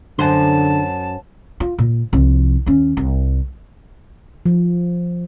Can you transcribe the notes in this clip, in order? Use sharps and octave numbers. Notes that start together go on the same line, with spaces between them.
F#2 D3 C5 A5
F4
A#2
C2 F3
D#2 C#4
C2
F3